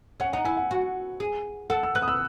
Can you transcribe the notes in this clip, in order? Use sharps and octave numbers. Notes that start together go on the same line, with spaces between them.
C#4 F#5
D#4 F#5
E4 G#5
F#5
F#4
G#4
A4 F#5
E6
B4 F#6
D#6
E6